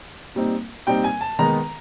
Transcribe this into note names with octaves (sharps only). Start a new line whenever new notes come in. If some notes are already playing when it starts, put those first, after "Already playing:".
A#2 G3 C4 D#4
A#2 G3 C4 D#4 G5
G#5
A5
D#3 G#3 B3 D#4 A#5